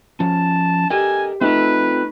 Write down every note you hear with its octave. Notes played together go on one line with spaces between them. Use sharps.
F3 C#4 A5
G4 A4 A#4 D#5 G#5
A3 C4 D#4 F4 A4 B4